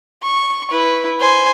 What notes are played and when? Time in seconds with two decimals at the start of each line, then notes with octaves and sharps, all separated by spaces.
0.22 C#6
0.71 E4 B4
1.19 C5 G#5